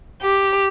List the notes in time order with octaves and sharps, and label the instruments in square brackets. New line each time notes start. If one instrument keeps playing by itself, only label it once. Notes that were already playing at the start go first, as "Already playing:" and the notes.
[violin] G4